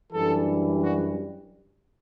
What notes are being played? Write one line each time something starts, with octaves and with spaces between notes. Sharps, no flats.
F#2 E3 G3 D4 A4
F#4